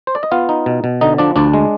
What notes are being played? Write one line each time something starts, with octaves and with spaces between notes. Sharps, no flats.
C5
D5
D#5
B3 F4 F5
D#4
B2
B2
D3 D#4 D#5
F3 D4 D5
D2 D4 D5
G#3